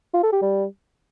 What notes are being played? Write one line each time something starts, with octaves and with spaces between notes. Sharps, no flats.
F4
A4
G4
G3